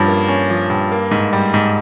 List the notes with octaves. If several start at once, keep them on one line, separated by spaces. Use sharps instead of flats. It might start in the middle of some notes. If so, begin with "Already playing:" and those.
Already playing: G2 F3 C#4
A#3
C#4
F3
G2
A#3
G#2
G3
G#2